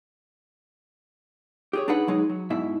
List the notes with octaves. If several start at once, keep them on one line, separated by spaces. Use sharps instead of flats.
G4 G#4 C#5
D4 D#4 G#4 B4 F#5
F#3 G#3 D#4 G#4
F#3
G#2 B2 E4 E5